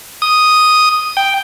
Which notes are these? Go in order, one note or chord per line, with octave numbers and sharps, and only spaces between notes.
D#6
G5